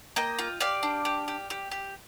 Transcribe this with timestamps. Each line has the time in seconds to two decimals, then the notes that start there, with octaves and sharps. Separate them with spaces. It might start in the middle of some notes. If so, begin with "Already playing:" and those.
0.16 A#3 D#5 G5
0.39 F4
0.60 G4 D5 F5
0.83 D4
1.05 G4
1.28 G4
1.50 G4
1.71 G4